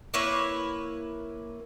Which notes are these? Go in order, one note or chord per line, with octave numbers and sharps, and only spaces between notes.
A#3 E4 B4 C#5